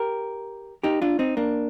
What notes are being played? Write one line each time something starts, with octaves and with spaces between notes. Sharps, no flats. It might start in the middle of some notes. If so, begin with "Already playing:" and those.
Already playing: G4 A#4
D#4 G4
D4 F4
C4 D#4
A#3 D4